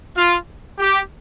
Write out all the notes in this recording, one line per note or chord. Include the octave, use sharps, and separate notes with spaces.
F4
G4